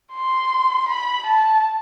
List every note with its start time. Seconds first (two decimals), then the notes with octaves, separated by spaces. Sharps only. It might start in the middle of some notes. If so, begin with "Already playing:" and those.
0.13 C6
0.89 B5
1.27 A5